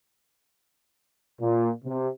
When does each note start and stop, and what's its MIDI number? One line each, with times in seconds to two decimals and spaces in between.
1.40 1.68 46
1.84 2.07 48